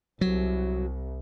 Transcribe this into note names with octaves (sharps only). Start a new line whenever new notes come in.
C2 F#3